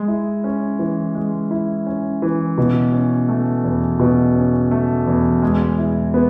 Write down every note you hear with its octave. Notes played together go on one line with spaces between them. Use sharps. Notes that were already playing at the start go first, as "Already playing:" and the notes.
Already playing: G#3
E4
C#4
E3
G#3
E4
C#4
E3
B2
C#4
A3
E2
B2
C#4
A3
E2
G#3
E4
B3